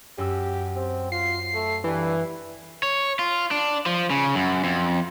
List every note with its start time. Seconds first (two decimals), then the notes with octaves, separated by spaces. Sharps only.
0.18 F#2 G4 E6
0.76 C4
1.12 F4 C7
1.54 A3
1.84 G2 E3
2.83 C#5
3.19 F4
3.51 D4
3.86 F3
4.10 C#3
4.35 F#2
4.64 F2